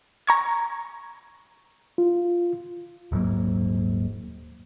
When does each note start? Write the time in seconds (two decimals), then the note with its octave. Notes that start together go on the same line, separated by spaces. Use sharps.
0.27 A#5 C#6 G#6
1.98 F4
3.12 D#1 G#2 F#3 A#3